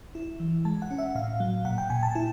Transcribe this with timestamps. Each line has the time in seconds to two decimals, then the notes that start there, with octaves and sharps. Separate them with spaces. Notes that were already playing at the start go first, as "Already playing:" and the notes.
0.15 E4
0.40 E3
0.65 G#3 A5
0.82 F#5
0.91 C#4
0.98 E5
1.15 A2 F5
1.40 F#3
1.65 A#2 F#5
1.78 G5
1.90 A#2 G#5
2.03 A5
2.15 E4